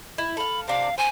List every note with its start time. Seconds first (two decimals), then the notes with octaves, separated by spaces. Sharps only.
0.18 E4
0.37 A4 F5 B5
0.68 C3 D4 F5
0.98 C5 G#5